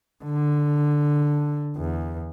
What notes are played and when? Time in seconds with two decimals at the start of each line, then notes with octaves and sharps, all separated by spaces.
0.24 D3
1.77 E2